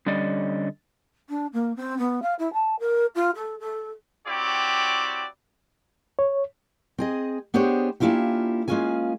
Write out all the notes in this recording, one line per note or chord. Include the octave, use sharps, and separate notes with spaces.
D3 G3 C#4 D5 D#5
D4
A#3
C4
B3
F5
E4
A5
A#4
F4
A4
A4
C4 E4 F#4 G4 C#5 D5
C#5
C4 G#4 D#5
B3 D4 G4 G#4 C5 C#5
A#3 C#4 D4 E4 F4 G4
G#3 A#3 C#4 F4 G#4 G#5